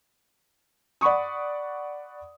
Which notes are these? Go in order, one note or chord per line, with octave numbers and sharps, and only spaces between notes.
D5 F#5 B5 C#6 D#6